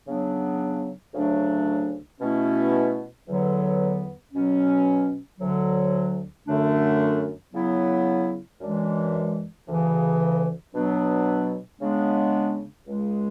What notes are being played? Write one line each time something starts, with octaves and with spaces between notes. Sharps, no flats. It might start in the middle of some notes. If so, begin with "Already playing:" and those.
C#3 F#3 B3 D4
D2 C#3 F#3 A3 D4
B2 A3 C#4 E4
E2 D3 F#3 B3
B2 F#3 C#4
D2 D3 F#3
F#2 D3 A3 D4
C#3 F#3 B3 E4
F#2 E3 G#3 D4
D2 C#3 E3
B2 F#3 B3 D4
C#3 G#3 B3 D4
C#2 C#3 G#3